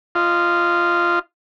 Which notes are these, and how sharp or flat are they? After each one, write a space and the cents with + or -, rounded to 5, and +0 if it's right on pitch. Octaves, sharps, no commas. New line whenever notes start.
F4 -10 D#5 -15